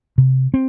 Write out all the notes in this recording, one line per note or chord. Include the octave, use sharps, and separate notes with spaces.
C3
C4